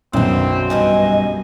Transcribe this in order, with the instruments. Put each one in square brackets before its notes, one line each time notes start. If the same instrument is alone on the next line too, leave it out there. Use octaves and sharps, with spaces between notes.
[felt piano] B1 F#2 D#3 [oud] B2 D3 [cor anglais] C4
[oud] G2 E3 G3 [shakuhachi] D#5 [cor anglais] G#5